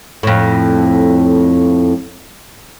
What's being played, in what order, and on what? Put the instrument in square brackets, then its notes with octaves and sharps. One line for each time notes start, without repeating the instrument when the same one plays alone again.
[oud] F2 A2